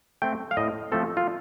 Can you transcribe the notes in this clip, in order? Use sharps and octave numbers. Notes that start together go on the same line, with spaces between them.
A3 C4 G5
F5
A2 D#5
F3 A3 C4 A4
F4